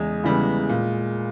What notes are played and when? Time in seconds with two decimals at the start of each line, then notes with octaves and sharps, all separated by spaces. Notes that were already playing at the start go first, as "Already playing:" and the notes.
Already playing: E2 C#3 E3 G#3
0.24 C#3 E3 G3 B3
0.69 A#2